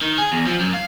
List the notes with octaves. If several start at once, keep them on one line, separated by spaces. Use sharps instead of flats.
D#3
G#4
E2
F3
F#2
F5